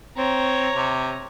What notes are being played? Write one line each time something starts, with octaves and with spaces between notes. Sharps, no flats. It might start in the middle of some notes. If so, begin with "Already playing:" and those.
C4 C#5 A#5
C3